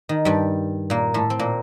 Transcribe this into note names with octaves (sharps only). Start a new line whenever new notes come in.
D#3
G2 G3
A#2 A#3
A2 A3
C4
A#2 A#3